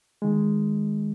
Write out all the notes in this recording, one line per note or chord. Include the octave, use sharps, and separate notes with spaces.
D#3 G#3